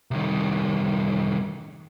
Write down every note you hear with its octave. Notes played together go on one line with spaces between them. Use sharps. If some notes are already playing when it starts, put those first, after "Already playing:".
C2 D#3